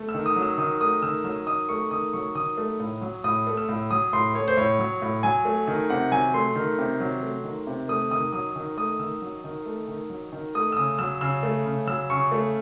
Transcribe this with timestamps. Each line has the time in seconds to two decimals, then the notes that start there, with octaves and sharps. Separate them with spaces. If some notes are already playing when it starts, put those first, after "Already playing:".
Already playing: A3
0.09 E6
0.14 D#3
0.26 D#6
0.36 F#3
0.42 E6
0.58 D#3 D#6
0.81 A3 D#6
1.02 D#3 E6
1.24 F#3 E6
1.46 D#3 D#6
1.69 A3 C#6
1.91 D#3 D#6
2.13 F#3 C#6
2.35 D#3 D#6
2.57 A3
2.80 A2
3.01 F#3
3.24 A2 D#6
3.47 A3
3.57 E6
3.69 A2
3.90 F#3 D#6
4.13 A2 C6
4.34 A3 C#5
4.48 C5
4.57 A2 C#5
4.79 F#3
5.02 A2
5.23 F#3 G#5
5.45 A3
5.68 D#3
5.90 C3 F#5
6.12 F#3 G#5
6.34 A3 C6
6.55 D#3
6.78 C3
7.00 F#3
7.22 A3
7.44 D#3
7.67 C3
7.88 A3 D#6
8.11 D#3 D#6
8.33 F#3 D#6
8.56 D#3
8.77 A3 D#6
8.99 D#3 E6
9.22 F#3
9.44 D#3
9.66 A3
9.88 D#3
10.10 F#3
10.32 D#3
10.55 A3 D#6
10.72 E6
10.77 C#3 D#6
10.99 F#3 E6
11.21 C#3 E6
11.43 A3
11.65 C#3
11.87 F#3 E6
12.10 C#3 C#6
12.32 A3